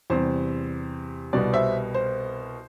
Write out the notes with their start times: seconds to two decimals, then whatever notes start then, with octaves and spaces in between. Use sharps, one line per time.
0.10 E2 C3 G3 C5
1.33 C2 B2 G3 B3 D5
1.53 C5 E5
1.94 C5